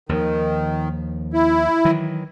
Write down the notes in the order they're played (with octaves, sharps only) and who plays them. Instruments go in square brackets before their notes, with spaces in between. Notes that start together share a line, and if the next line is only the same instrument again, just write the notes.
[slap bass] D#2 F3 [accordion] D#3
[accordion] E4
[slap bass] D#3 E3 F#3